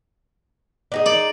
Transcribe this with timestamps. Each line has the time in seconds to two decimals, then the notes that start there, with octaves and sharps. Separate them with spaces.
0.92 D4 D#4 G#4
1.06 D5 F#7